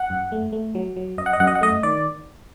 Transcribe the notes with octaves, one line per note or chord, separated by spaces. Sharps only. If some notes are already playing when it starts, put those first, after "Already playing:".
Already playing: F#5
F#2
A3
A3
F#3
F#3
F#2 D#5
F#5
D#5
F#2 F#5
D#5
F#5
A3 D#5
D#3 D5